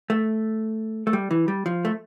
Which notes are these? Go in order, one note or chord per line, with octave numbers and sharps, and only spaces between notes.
A3
A3
G3
E3
G3
F3
A3